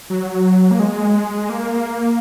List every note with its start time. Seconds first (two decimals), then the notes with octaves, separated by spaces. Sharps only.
0.10 F#3
0.71 A#3
0.79 G#3
1.49 A#3